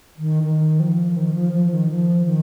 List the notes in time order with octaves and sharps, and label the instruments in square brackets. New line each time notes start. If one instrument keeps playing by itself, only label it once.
[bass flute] D#3
D#3
F3
D#3
F3
F3
D#3
F3
D#3